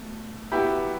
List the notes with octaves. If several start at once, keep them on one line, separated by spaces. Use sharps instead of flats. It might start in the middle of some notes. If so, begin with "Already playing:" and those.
Already playing: B2 A3
F#3 B3 E4 F#4 G4